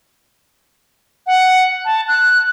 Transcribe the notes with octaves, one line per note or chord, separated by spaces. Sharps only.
F#5
A5
F#6